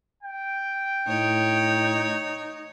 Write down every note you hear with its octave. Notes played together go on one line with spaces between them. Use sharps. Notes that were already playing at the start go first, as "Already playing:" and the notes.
G5
A2 D#4 C#5